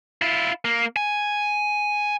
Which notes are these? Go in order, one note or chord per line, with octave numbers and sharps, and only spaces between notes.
E4 F4
A#3
G#5